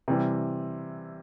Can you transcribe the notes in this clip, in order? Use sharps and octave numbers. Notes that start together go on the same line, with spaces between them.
C3 E3 G3